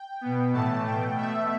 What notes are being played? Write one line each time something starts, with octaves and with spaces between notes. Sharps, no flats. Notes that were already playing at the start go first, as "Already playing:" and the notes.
Already playing: G5
B2 B3
A2 E3 A3 A5
B2 A3 G5
B2 A3 E5